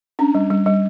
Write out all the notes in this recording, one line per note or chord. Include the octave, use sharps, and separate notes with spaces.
C#4 D4
G3
G3
G3